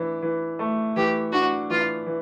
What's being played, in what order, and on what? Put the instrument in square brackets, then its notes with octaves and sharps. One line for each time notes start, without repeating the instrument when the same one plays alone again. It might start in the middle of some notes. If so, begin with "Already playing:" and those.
Already playing: [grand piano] E3 D4
E3
A3
[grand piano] E3 [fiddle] G4
[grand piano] D4 [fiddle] F#4
[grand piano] E3 [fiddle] F4
[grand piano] E3